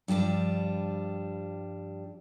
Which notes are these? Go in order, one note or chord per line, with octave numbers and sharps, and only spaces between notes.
G2 F3 G3 D4